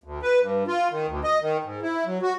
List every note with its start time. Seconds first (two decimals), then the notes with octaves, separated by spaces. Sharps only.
0.04 D2
0.22 B4
0.40 G2
0.67 F4
0.91 D#3
1.07 D2
1.24 D#5
1.42 D#3
1.64 G#2
1.82 E4
2.05 F#3
2.22 F#4